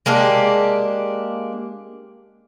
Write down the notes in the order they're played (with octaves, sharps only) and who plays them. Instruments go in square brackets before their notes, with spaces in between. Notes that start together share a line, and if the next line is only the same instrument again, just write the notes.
[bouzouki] G#3 A#3 D4 G4